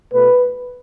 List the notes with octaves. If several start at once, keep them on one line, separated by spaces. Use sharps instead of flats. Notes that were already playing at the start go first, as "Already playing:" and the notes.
B2 A3 B4